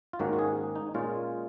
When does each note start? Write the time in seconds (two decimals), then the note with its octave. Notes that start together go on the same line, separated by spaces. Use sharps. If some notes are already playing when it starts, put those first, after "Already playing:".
0.13 F4
0.19 G#2 D#3 A#3 C#4 F#4
0.33 F#4
0.39 G#4
0.76 D#4
0.94 A#2 G#3 C#4 F4